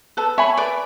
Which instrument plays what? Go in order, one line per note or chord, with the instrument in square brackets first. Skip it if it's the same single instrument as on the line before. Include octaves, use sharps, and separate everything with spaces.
[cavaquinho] A4 [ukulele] B4
[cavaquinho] C#5 [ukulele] E5 G#5 B5
[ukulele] B4 [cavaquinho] D5